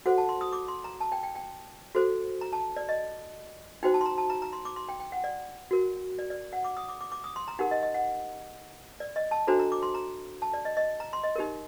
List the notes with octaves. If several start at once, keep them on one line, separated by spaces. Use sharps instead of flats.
F#4 A4 C5 F#5
A5
C6
D#6
D6
C6
A#5
A5
G5
G5
G5
F#4 A4 C5
A#5
A5
D5
D#5
D#4 F#4 C5 G5
A5
C6
A#5
A5
A#5
A#5
C6
D6
C6
G5
G5
F#5
D5
F#4 A#4
D5
D5
F#5
D6
D#6
D6
D6
D6
D#6
C6
A#5
D#4 G4 A#4 F#5
D#5
D#5
F#5
D5
D#5
A5
D4 F#4 A4 C5 A#5
A#5
D6
C6
A#5
A5
D5
D#5
D#5
A#5
C6
D#5
D#4 G4 A#4